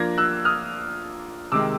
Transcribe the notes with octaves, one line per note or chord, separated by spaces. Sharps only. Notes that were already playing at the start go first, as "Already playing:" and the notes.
Already playing: F3 A#3 D4 F4 G#6 A#6
E6 F#6
D#6 F6
C3 D#3 G#3 D6 E6